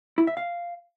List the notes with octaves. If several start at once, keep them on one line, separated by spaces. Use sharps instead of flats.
E4
E5
F5